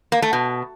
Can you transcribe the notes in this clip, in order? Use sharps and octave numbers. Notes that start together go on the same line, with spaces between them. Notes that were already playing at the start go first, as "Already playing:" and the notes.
A#3
A3
B2